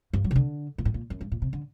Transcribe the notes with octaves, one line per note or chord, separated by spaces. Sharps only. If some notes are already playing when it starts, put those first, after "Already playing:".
G2
F#3
C3
D3
A#2
A2
A#2
F#2
G2
A#2
C3
D3